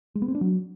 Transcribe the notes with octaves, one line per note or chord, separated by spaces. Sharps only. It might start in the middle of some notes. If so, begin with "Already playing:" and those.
G#3
B3
C4
D4
F#3